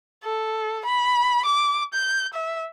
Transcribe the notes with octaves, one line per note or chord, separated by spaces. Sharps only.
A4
B5
D6
G6
E5